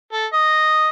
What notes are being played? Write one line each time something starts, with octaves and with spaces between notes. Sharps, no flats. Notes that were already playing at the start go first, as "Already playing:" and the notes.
A4
D#5